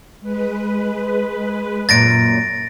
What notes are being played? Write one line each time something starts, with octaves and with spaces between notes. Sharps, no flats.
G#3 B4
F#2 A#2 A6 A#6 D7